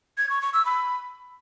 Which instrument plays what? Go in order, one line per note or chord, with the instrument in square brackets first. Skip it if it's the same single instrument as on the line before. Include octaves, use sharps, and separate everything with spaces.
[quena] G#6
C#6
C#6
E6
B5